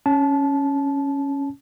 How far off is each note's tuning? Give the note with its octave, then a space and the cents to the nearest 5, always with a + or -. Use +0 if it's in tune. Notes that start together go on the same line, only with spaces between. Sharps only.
C#4 +0 A5 -20